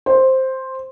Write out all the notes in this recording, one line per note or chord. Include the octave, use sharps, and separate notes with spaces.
C5